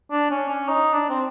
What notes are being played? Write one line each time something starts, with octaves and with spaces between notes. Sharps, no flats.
D4
C#4
C#4
D#4
D4
C4